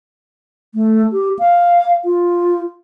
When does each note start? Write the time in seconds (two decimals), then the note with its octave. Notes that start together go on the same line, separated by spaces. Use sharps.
0.75 A3
1.13 G4
1.39 F5
2.05 F4